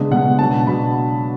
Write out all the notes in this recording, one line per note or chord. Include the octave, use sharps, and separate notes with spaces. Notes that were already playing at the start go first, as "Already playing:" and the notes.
Already playing: C#3 G#3 B3 D4
C#3 G#3 B3 D4 F#5
B2 F#3 B3 D4 A5
B2 F#3 B3 D4 B5